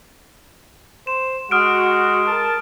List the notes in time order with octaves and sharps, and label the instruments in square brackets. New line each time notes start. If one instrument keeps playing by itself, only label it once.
[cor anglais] C5 [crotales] E7
[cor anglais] G#3 [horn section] F#4 [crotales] D#6 F6 D7
[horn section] A#4 A5